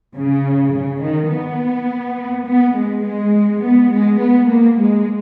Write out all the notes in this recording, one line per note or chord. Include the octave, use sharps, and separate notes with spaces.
C#3
C#3
D#3
B3
B3
G#3
G#3
B3
G#3
B3
A#3
G#3